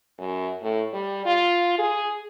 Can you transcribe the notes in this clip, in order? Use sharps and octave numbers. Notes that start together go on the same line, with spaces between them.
F#2
A2
G3
F4
G#4